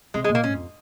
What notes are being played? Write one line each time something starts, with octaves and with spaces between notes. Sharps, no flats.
C3 G#3
G#3
A#2
A#3
G#2 C#4
F2